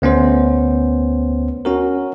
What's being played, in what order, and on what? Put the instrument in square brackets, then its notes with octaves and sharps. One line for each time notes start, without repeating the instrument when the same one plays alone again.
[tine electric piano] D2 B3 C#4 C5
C#4 F#4 A#4